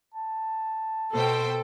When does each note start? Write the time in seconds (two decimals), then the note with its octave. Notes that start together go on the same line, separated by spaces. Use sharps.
0.14 A5
1.13 B2 A4 C5 G5